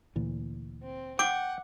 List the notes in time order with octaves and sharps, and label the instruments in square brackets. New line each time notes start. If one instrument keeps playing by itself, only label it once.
[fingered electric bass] D2 A#2 E3
[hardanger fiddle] C4
[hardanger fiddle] F#5 [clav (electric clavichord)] G5 [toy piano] D6